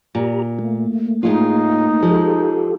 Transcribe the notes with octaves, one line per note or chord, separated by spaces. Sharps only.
A#2 G4 A#5
A3 A#3
A2 G#3 D#4 F4
F3 G#3 F4 G4 A4